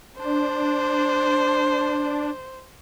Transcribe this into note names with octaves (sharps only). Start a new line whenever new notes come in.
D4 C5